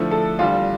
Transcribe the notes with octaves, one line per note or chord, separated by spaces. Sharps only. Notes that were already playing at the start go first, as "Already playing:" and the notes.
Already playing: D3 F3 A3 E4
A4
E2 D3 G3 F4